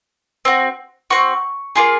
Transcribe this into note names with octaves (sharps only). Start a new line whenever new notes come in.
C4 F#4
C4 F#4 C#6
A#3 F4 G#4